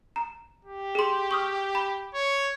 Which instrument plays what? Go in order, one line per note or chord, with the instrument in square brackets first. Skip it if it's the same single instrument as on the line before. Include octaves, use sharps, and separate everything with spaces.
[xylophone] A#5
[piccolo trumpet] G4
[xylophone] G#4 C6
C#6 D#6 F6
B5
[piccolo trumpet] C#5